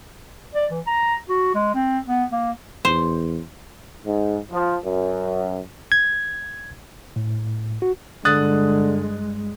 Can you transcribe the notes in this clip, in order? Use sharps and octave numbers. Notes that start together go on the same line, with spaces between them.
D5
E3
A#5
F#4
G#3
C4
B3
A#3
E2 C5
G#2
F3
F#2
G#6
A2
F#4
G2 D3 G#3 D#6 F#6 A6